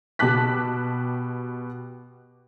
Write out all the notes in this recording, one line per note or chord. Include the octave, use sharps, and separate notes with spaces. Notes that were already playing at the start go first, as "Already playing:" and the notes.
B2 G4 A5 D6 F#6 B6